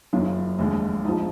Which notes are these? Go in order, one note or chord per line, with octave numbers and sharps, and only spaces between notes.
F#1 F#2 D#3 F4
F1 D#2 D3 G#3
A#1 G#2 F3 D#4
D4